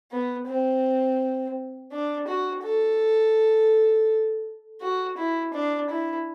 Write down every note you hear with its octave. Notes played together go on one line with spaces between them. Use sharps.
B3
C4
D4
F#4
A4
F#4
E4
D4
E4